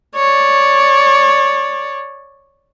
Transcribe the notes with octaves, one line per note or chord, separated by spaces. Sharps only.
C#5 D5